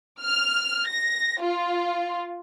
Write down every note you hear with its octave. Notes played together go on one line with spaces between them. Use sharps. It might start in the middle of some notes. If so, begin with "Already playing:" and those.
F6
A#6
F4